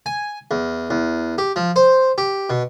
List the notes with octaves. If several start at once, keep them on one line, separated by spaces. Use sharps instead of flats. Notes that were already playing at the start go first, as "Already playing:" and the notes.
G#5
E2
E2
G4
F3
C5
G4
B2